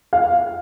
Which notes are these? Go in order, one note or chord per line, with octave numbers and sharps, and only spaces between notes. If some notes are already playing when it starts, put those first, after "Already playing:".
F5